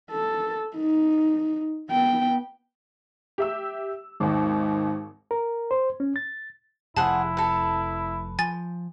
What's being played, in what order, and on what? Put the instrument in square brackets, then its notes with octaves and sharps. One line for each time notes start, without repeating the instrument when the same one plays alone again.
[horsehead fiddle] A4
D#4
B3 G5
[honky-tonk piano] G4 E5 E6
[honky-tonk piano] G#1 D#2 [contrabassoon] G#2
[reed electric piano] A#4
C5
C#4
A6
[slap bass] F1 F2 [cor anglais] E4 [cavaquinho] G#4 C5 F#5 [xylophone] A5
[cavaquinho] A4 B4
[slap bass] F3 [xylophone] G#5 A6